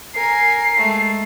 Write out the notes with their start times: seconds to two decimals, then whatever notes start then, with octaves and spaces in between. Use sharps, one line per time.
0.14 A#4 G#5 A#5 C7
0.78 G#3 A3